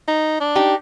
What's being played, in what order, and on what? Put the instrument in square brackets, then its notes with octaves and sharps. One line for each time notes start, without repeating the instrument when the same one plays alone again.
[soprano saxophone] D#4
D4
[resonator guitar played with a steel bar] D#4 G4